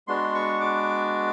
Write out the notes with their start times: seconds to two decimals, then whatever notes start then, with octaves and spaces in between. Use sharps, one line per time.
0.07 G#3 B3 D4 F#4 C6
0.34 C#6
0.61 D6